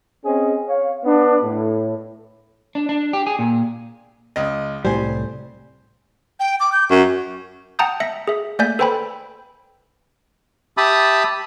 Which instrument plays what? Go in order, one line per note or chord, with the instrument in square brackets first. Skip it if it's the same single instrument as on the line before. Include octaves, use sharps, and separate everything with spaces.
[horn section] C4 C#4 G#4 D#5
C#5 F5
B3 D4
A2
[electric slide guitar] D4
D4
G4
G#4
A#2
[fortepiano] C#2 D#5
[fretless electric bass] C2 A2 G3 [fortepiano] C5 G#5
[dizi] G5
D6
G6
[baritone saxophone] F#2 [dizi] C#6
[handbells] F#5 G5 A5 A#5 D#6 G6
E5 A#6 C#7
G#4 E5
A3 A#3 D5 G#5 G6 B6
A4 B4 C5 G5 G#5 B5
[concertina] G4 E5 A5 B5 D#6